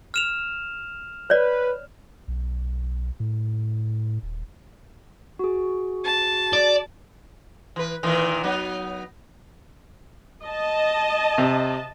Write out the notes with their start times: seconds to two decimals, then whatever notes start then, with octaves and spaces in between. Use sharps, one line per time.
0.14 F6 E7 F7
1.30 B4 C#5 D5
2.28 B1
3.20 A2
4.22 D#1
5.39 F#4 G#4
6.05 A5
6.53 D5
7.76 E3 B4
8.03 A#2 D#3 E3
8.44 F#3 B3 D#4
10.45 D#5 A5
11.38 C3